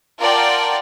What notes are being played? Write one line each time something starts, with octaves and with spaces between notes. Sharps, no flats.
F4 A#4 D5 F#5 G5 A5